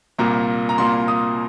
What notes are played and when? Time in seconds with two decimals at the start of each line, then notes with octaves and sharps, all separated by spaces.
0.19 C2 A#2 A#3 A#5
0.69 A#5
0.78 C2 A#2 A#3 C6
1.08 D#6